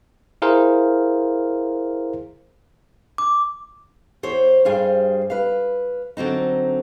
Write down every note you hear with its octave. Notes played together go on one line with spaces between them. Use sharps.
E4 G#4 A#4 C5 F5
D6
E2 C5 C#5
G2 G3 G#4 C5 F5
B4 F5
D3 F#3 C4 D#4